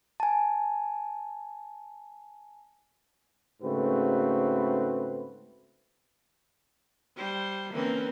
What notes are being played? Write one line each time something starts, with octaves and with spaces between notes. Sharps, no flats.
G#5 A5
G#2 C#3 A3 C4 F#4 B4
G3 C5
D3 E3 A#3 C4 C#4 A#4 B4